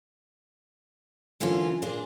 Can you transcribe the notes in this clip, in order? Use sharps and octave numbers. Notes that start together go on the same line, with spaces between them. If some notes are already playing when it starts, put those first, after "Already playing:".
F#2 D3 E3 A#3 C#4 F4
A#2 A#3 D4 F4 G#4